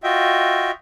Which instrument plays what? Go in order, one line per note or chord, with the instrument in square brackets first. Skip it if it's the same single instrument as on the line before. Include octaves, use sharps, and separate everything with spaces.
[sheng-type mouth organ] F4 F#4 D#5 E5 G5